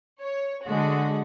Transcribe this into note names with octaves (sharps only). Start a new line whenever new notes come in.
C#5
D3 G#3 F#4